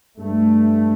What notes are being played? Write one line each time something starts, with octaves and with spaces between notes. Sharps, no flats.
G2 A3